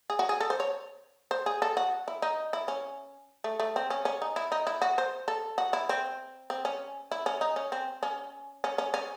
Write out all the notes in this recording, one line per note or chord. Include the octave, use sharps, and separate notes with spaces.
G#4
F#4
G#4
A4
C5
C#5
C5
G#4
A4
F#4
E4
D#4
E4
C#4
A3
A3
C4
C#4
C#4
D#4
E4
D#4
E4
F#4
C5
A4
F#4
E4
C4
C4
C#4
E4
C#4
D#4
C#4
C4
C#4
C#4
C#4
C#4